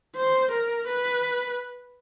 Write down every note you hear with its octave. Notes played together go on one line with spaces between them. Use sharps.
C5
A#4
B4